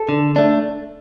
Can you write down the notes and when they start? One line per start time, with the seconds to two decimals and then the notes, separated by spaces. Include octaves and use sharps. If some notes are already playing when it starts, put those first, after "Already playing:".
Already playing: A4
0.09 D3
0.36 A3 D4